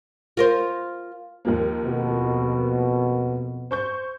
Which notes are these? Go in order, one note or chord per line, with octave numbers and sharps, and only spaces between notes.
F4 A#4 C5
D#2 F3 A#3
F2 B2
C5 C#6 G6